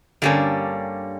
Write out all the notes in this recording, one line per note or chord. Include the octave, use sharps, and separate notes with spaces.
G2 D3 G3 A#3 C#4